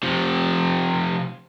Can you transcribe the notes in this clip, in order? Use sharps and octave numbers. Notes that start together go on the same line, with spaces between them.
C3 F3